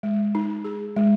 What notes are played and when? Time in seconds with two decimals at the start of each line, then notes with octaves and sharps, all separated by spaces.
0.03 G#3
0.35 D#4
0.65 G#4
0.96 G#3